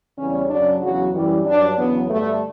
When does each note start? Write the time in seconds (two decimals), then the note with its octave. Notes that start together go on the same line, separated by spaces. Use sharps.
0.18 E2 C#3 G3 C#4
0.50 F#2 C#3 F#3 D4
0.83 E2 C#3 F#3 F#4
1.14 F#2 E3 G3
1.46 G2 F#3 D4
1.79 E2 C#3 F#3 B3
2.10 G2 D3 G3 A3